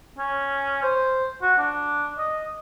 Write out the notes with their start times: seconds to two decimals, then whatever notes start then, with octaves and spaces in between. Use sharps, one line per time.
0.18 C#4
0.83 C5
1.42 F#4
1.58 D4
2.18 D#5